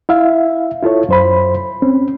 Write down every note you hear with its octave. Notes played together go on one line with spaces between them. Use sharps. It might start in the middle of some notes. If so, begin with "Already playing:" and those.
E4 E5 F5
E4 F4 A4 C#5
F#2 C5 B5
C4 C#4